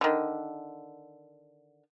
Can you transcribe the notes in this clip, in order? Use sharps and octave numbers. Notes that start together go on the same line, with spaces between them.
D3 D#3